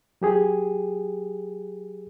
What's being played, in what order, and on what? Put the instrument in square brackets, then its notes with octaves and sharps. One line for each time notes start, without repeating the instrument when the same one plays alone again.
[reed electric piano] F#3 G4 G#4